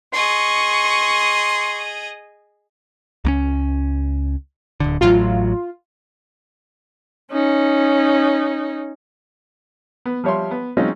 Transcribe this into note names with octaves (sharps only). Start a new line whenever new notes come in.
G#4 D#5 C6 C#6
C#2 A#3 C#4
D1 B1 D3
A1 A2 F#3 F4
C#4 D#4
B3
F3 G3 C#5 E5 C6
B3
F#3 G#3 C4 C#4 D#4 F4